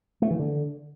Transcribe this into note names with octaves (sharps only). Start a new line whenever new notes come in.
A3
E3
D3